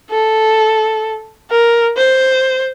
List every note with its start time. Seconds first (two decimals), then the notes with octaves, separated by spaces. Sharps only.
0.10 A4
1.51 A#4
1.97 C5